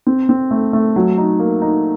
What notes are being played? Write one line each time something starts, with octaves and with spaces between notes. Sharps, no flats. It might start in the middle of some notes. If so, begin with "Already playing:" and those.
C4
C4
A3
A3
F#3
D#4
A#3
D#4